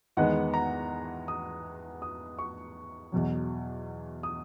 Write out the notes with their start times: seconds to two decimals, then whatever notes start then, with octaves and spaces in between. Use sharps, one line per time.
0.17 E2 D#3 G#3 B3 F#5
0.54 A#5
1.28 D#6
2.02 D#6
2.39 C#6
3.12 E2 B2 F#3
4.23 D#6